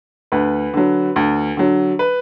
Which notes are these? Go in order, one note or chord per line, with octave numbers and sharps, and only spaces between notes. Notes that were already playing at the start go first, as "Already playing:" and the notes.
D2 B4
D3 F#3
D2
D3 F#3
B4